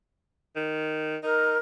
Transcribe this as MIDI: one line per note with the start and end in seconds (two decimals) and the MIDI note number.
0.56 1.17 51
1.23 1.57 63
1.23 1.58 70